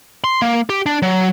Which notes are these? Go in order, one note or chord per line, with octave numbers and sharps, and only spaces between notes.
C6
A#3
G4
D4
F#3